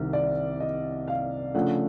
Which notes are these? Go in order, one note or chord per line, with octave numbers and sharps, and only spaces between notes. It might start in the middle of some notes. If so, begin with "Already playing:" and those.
Already playing: C2 C3 D#3
D5
D#5
F5
C#3 F3 A3 D4 F#5